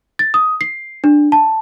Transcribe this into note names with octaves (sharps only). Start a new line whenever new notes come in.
A6
D#6
C7
D4
A5